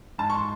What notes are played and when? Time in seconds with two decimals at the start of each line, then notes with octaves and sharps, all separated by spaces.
0.18 G#2 A5
0.30 C#6
0.34 C6